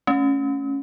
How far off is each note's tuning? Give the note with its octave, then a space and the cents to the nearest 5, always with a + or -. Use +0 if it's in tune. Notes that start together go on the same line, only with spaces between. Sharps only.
A3 +0 C#4 +0